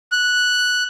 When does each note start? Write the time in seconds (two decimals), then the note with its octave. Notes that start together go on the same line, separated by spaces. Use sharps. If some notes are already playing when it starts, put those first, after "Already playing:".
0.12 F#6